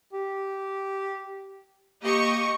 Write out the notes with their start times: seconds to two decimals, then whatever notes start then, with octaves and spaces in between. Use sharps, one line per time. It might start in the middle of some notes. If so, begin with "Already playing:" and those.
0.13 G4
2.03 A#3 G4 D#5 C#6